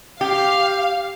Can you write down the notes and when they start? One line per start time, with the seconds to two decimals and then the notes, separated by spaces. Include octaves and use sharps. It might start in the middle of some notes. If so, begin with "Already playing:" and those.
0.21 G4 F5